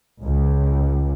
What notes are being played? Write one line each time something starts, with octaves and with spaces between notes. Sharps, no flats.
C#2